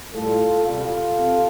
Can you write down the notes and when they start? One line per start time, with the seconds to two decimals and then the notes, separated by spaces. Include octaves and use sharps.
0.13 A2 G3 F4 A4
0.65 C3 G3 F4 A4
1.17 C3